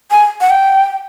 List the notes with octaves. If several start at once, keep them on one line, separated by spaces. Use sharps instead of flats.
G#5
F#5
G5